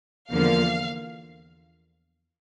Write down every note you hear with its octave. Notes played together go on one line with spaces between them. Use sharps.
E2 D3 F3 A#3 F5